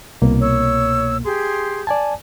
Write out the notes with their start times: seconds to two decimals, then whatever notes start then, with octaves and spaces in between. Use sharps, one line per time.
0.22 C2 B2 A#3
0.40 C#5 E6
1.24 G4 G#4 C6
1.87 D5 G#5 A5